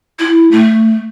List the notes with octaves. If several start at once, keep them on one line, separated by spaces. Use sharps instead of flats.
E4
A3